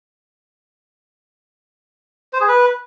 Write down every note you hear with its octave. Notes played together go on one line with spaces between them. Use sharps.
C5
G#4
B4